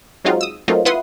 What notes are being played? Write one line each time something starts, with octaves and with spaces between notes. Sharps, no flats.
F#3 G#3 C4 D#4 F4 F#4
D#6 E6
F#3 A3 A#3 C4 D#4 F4
E4 F4 B4 F#5 C6 D#6